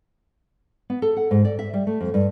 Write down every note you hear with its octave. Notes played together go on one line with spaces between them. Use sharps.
B3
A4
F#5
G#2
D5
E5
G3
A3
F2
G2